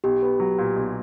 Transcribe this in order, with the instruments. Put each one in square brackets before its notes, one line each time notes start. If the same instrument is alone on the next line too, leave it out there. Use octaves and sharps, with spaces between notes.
[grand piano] B1 [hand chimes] G4
[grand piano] B3
F#3
A#2
B1